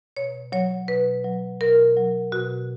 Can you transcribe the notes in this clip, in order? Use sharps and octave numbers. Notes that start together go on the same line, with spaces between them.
B2 C#5
F#3 C#5
B2 B4
F#3
B2 A#4
F#3
B2 F#4